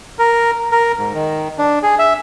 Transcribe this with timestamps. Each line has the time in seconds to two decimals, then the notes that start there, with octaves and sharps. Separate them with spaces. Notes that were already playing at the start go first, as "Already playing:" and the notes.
0.19 A#4
0.72 A#4
0.98 G#2
1.13 D#3
1.58 D4
1.83 G#4
1.99 E5